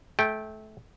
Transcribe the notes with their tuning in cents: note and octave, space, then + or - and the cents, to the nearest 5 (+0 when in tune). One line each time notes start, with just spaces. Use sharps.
A3 -25 G5 +0